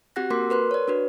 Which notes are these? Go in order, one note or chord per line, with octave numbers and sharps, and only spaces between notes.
C4 F#4 G4 F#5 F#6 A#6
A#3 F#4 A#4 C6 D6 B6
A#4 B4 C6 F#6
C#5 D5
D4 F#4 B4